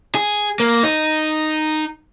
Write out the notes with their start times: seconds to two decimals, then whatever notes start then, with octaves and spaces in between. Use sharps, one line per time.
0.15 G#4
0.60 A#3
0.83 D#4